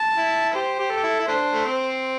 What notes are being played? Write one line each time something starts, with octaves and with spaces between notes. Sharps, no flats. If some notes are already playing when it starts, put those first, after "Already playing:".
Already playing: A5
E4
G4 C5
G4
A4
G4
E4
E4
A3 D4 C5
A3
C4